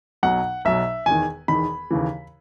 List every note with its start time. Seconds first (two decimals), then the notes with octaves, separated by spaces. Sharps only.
0.23 B1 B2 F#3 F#5
0.65 B1 B2 F#3 E5
1.06 E1 E2 D#3 G#5
1.48 E1 E2 D#3 B5
1.91 D#2 C#3 E3